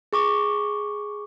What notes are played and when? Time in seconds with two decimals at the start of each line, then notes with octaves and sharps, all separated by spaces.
0.13 G#4 C#6 D6